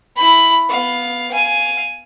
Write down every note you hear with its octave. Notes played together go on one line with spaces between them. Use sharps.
E4 B5
B3 F5
F5 G#5